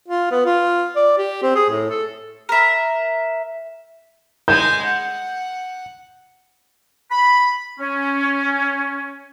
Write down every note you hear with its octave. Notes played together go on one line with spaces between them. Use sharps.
F4
B3
F4
D5
G4
C4
G#4
A2
A4
A#4 E5
G#3 G#5 G6
F#5
B5
C#4